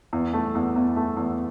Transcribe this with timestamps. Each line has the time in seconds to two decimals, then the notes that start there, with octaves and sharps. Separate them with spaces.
0.13 E2
0.33 A3
0.55 E2
0.76 E2
0.96 A3
1.17 E2